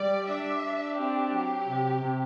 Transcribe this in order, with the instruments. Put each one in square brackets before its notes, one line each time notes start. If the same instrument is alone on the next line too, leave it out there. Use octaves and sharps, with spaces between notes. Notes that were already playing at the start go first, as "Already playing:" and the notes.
Already playing: [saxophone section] G3 G4 [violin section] D5
[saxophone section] D4 [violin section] E5
[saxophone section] D4
[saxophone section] C4 [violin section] G4
[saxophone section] F#3
C3
C3